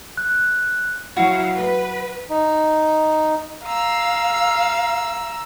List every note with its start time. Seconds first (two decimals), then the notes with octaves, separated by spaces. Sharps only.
0.17 F#6
1.17 F#3 E4 F#4 F5
1.57 B4
2.30 D#4
3.64 F5 A#5 E6